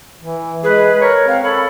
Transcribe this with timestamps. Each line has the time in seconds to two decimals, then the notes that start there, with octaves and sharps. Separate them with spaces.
0.20 E3
0.64 G#3 G#4 B4
1.01 A#4 C#5
1.28 C4 F5
1.43 A4 C#5 B5